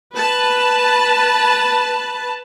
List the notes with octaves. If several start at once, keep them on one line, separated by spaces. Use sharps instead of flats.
B4 A5